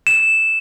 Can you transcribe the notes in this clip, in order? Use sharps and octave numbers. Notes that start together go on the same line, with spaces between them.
E7